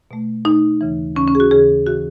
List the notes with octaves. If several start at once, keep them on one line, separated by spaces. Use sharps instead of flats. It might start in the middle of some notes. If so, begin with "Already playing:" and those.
B2 A3
B2 A3 D#4
D#2 C#3 E3
D#2 C#3 E3 C#4
C#4
G#4
F#4
D#2 C#3 E3 G#4
C#3 E3 F#4